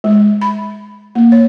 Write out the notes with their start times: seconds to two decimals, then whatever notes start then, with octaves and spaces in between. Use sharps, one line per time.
0.04 G#3
0.41 B5
1.15 A#3
1.32 C#5